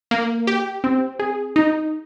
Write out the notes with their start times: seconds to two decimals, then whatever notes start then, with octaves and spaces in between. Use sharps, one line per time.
0.11 A#3
0.47 G4
0.84 C4
1.19 G#4
1.56 D#4